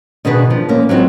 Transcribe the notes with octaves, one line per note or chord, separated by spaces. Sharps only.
B2 D#3 D4 G#4 B4
F3
A#3 C#4
F#3 G#3 C4 E4 F4